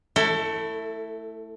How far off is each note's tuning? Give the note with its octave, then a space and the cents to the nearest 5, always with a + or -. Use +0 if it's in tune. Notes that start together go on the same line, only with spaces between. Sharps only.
A3 +0 E4 +0 A4 +30